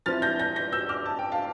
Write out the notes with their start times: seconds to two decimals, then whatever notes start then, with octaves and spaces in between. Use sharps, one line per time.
0.06 F3 C4 E4 F6 A6
0.22 G6 A#6
0.39 G6 A#6
0.56 G6 A#6
0.72 E6 G6
0.89 D6 F6
1.06 A5
1.19 G5
1.32 F5 A5